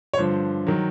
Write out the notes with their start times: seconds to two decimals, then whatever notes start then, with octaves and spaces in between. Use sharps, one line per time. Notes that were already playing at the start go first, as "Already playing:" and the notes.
0.13 C#5
0.18 G2 D3 F3 C5
0.67 D#3 F#3